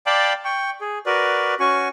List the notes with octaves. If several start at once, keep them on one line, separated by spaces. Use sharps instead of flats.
D5 F5 G5 A5 B5 D6
G5 C#6
G#4
F#4 A#4 B4 D5
C#4 F#4 G#5 C#6